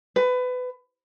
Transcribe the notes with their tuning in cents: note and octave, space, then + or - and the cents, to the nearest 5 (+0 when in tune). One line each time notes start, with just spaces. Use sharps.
B4 +25